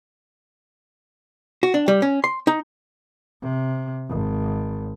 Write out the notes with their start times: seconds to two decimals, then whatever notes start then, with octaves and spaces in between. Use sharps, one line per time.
1.63 F#4
1.74 D4
1.88 G3
2.02 C#4
2.24 C6
2.47 D#4
3.42 C3
4.09 G#1